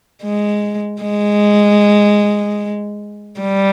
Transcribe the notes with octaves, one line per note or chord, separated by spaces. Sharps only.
G#3
G#3
G3